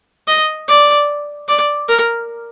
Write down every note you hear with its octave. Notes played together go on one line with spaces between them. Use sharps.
D#5
D5
D5
A#4